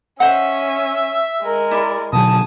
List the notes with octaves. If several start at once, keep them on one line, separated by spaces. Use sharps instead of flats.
C#4 C5 D#5 E5 F#5
G#3 A#4
E4 D5
B2 D3 F#3 G#4 A5 D#6